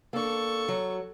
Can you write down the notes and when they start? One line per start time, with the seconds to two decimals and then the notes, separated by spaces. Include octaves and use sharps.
0.13 A#3 D4 A4 C#6
0.68 F#3